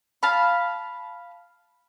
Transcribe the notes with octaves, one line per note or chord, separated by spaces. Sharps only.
F5 A5 B5